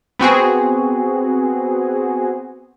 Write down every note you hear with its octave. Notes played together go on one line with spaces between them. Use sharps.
B3 C4 F#4 G#4